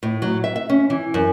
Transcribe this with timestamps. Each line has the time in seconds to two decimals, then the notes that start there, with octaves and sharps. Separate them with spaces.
0.03 A2
0.22 F#3
0.44 E5
0.56 E5
0.70 C#4
0.90 E3
1.14 F#2